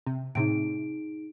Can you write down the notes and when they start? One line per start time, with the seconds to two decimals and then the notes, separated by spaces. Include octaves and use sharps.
0.07 C3
0.35 A2 C3 D#4 G#4 D7